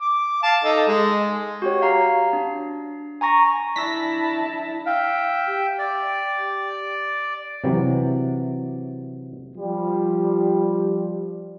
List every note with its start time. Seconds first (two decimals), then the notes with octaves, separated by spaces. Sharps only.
0.01 D6
0.43 F5 A5
0.64 D#4 A4
0.87 G#3
1.62 F#4 G4 C#5
1.82 F5 A#5 C7
2.33 D4
3.21 G#5 A#5 C#6 A#6
3.76 D4 E4 E5 A5 A#6 B6
4.86 E5 F5 G5
5.48 G4
5.79 D5
7.64 C3 E3 F#3
9.56 F3 G3